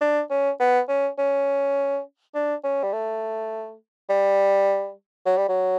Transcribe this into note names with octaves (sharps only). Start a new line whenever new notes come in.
D4
C#4
B3
C#4
C#4
D4
C#4
G3
A3
G3
F#3
G3
F#3